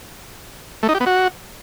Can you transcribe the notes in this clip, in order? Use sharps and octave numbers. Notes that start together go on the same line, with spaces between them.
A3
D#4
G4
B3
F#4